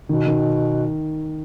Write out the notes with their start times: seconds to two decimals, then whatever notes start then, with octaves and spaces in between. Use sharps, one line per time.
0.09 B2 D#3
0.26 D#3